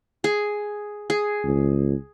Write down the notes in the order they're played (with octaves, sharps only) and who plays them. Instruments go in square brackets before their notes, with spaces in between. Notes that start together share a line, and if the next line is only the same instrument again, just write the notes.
[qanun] G#4
G#4
[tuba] C#2